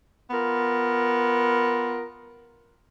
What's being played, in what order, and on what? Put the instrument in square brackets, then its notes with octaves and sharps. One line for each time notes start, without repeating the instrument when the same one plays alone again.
[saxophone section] B3 F4 A#4